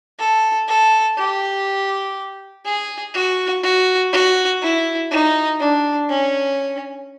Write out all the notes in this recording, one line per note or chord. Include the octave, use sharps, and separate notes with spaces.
A4
A4
G4
G#4
F#4
F#4
F#4
E4
D#4
D4
C#4